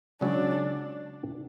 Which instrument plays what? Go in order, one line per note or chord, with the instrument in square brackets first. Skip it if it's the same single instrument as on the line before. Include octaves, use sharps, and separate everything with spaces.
[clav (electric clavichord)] C#2 C#3 F#3 C#4 [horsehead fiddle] D4